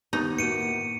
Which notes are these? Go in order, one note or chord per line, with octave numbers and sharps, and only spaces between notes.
D#2 B3 D#4
A2 A#3 F#4 C#7 D#7